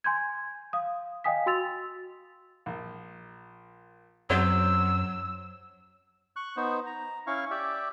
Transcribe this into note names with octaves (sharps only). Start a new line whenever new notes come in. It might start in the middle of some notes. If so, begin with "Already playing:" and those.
G#5 C6 G6 G#6
F5 D#6
D#5 F5 G5 G#5 D#6 B6
F#4 C6 E6 A6 F7
A#1
F#2 F#3 C4 F#4 C5 E6
C#6 F#6
B3 D#4 C5
A#5
C#4 E4 F5 C#6
G4 D5 E5